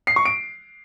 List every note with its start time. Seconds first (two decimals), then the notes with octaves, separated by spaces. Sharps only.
0.07 C7
0.16 C#6
0.25 D7